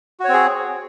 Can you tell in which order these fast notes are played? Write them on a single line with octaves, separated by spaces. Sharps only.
F#4 C#5 C4 G#4